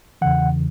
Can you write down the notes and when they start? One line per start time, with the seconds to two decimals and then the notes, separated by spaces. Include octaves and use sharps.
0.21 E2 C#3 E3 F#5